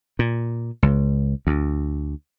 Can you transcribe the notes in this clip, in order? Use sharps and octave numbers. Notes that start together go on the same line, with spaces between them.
A#2
C#2
D2